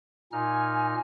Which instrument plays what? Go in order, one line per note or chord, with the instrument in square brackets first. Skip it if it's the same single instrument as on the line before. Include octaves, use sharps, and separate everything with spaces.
[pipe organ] A#2 D#4 F6 [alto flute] G#5